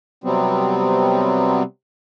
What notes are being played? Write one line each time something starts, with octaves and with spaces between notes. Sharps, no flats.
C3 F#3 G3 B3 C4